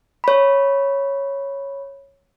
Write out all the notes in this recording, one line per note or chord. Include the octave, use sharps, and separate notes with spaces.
C#5 B5